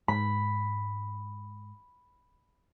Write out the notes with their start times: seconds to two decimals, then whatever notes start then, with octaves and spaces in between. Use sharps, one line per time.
0.08 G#2 B5